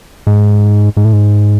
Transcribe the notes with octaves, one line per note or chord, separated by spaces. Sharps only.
G#2
G#2
A2
G#2